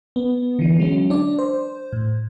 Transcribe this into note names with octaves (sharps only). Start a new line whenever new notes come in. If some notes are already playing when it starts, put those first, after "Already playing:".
B3
D3 E3
D3 F#3 G#3 C#4
D4 D5
C5
A2